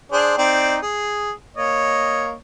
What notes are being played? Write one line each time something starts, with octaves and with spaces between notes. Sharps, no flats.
D4 G#4 C5
C4 D#4 D5
G#4
A#3 C#5 D#5